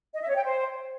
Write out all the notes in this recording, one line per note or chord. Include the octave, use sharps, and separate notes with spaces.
D#5
E5
C#5
G5
C5